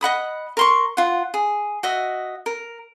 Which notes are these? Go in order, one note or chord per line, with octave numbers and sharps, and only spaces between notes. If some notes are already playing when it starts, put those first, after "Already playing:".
D#5 F#5 B5 D#6
A#4 C6 C#6
F4 F#5
G#4
F#4 D#5 E5
A#4